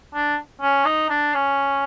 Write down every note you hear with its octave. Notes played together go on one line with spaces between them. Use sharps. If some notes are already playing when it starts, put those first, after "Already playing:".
D4
C#4
D#4
D4
C#4